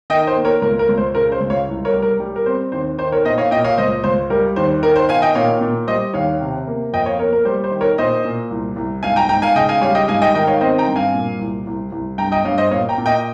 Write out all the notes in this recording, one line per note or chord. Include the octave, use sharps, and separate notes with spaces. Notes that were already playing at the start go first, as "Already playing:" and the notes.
D#3 D#5 G5
C5
A#3
A#4 C#5
C#2 A#4
A#4
C#2
C5
C#3 A#4
C5
C#2
C#5 F5
C2
A#4 C#5
G3
A#4
G3
A#4
C4 C5
D#2 C5
D#3 C5
A#4 C#5
A#2 C5 D#5
C#5 F5
A#2 D#5 G5
C#5 F5
C#2 C5 D#5
C#2 C5
G3 A#4
D#2 C5
D#3 A#4
C5
D#3 F5 G#5
D#5 G5
A#2 C#5 F5
A#2
G3 C5 D#5
D#2 C#5 F5
C3
A#3
F2 D#5 G5
C#5 F5
A#3 A#4 C#5
A#4
G3 C5
C5
D#3
A#4 C#5
A#2 C5 D#5
A#2
C2
C2
G#2 F5 G#5
G5 A#5
G#2 G5 A#5
F5 G#5
C#3 D#5 G5
F5 G#5
G3 C#5 F5
D#5 G5
G#2 F5 G#5
D#5 G5
D#3 D#5 G5
C#5 F5
C4 C5 D#5
G5 A#5
G2
F5 G#5
A#2
C2
C2
C2
G2 G5 A#5
D#5 G5
G2 C#5 F5
C5 D#5
A#2 C#5 F5
G5 A#5
A#2
D#5 G5